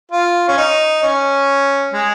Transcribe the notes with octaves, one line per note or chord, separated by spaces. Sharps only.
F4
C#4
D#4
C#4
G#3